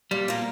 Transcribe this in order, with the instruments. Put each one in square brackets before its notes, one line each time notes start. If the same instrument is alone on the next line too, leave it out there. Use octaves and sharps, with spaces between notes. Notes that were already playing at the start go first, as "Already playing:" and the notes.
[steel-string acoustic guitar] A#2 [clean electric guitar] G3
[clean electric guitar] A#2 [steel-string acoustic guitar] F3 A#3